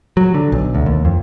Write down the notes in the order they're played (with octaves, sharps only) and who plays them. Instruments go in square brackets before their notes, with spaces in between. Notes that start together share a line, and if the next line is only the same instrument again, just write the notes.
[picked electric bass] F#3
D3
B1
D2
D#2
F2